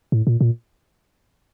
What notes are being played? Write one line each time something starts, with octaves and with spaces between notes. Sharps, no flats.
A2
A#2
A#2